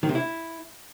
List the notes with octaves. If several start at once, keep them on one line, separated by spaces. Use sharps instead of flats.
D#3
C3
E4